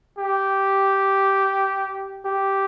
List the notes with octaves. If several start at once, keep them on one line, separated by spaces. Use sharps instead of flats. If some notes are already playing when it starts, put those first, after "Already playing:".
G4
G4